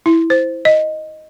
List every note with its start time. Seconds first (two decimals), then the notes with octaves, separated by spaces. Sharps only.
0.06 E4
0.30 C5
0.65 D#5